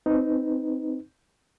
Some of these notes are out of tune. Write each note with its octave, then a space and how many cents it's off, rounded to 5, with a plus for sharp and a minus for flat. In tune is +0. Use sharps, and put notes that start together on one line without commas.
C4 +0 D#4 +0 B4 +15